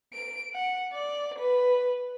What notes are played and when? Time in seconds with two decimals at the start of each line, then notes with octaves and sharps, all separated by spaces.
0.14 D7
0.54 F#5
0.93 D5
1.39 B4